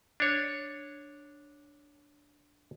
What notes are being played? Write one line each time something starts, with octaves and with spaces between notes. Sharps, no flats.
D4 C#5